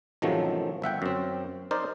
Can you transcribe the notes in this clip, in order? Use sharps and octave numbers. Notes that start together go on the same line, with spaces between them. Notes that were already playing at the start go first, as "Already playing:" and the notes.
A1 C3 D#3 F3 F#3 A3
G1 E5 F#5 G5
F#2 C4
D#4 A#4 C5 D5